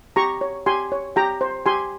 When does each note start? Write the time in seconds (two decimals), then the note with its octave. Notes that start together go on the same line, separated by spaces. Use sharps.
0.16 G4 A#5 C#6
0.41 C#5
0.66 G4 G#5 C6
0.92 C#5
1.16 G4 G5 A#5
1.41 C5
1.66 G4 G#5 C6